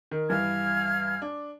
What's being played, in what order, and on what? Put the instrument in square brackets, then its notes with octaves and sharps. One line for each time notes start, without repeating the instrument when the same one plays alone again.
[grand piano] D#3
[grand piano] G2 E3 [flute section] F5 F6 G#6
[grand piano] D4